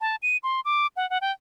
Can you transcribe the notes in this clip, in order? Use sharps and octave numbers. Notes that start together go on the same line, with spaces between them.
A5
D#7
C6
D6
F#5
F#5
G5